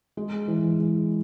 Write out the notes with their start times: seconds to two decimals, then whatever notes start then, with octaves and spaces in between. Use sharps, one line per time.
0.17 G#3
0.48 E3
0.79 G#3